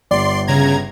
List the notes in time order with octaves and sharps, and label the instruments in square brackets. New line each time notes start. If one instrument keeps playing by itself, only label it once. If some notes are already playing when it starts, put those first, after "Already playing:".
[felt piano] G1 [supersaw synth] D5 C6 C7
[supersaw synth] C#3 A#5 G#6